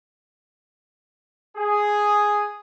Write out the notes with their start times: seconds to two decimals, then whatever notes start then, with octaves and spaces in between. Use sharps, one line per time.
1.58 G#4